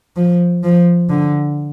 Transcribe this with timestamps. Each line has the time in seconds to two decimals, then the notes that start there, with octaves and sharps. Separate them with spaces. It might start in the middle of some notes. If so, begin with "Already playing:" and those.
0.17 F3
0.64 F3
1.09 D3